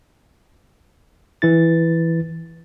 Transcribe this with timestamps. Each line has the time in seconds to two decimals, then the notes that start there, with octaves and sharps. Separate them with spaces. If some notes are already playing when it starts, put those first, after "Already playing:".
1.42 E3 E4 A6